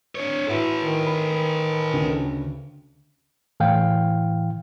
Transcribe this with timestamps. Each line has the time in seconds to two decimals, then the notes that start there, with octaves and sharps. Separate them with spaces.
0.15 D4 C#5
0.47 A2 F#4 A4 B4 E5
0.83 D#3
1.07 B5
1.94 D2 C#3
3.60 A2 E3 F5 G5